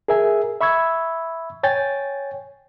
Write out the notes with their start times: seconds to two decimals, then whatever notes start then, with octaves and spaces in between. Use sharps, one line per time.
0.08 G#4 A#4 E5 G#5
0.61 E5 B5 C#6 E6 G#6
1.63 C#5 G5 G#5 A6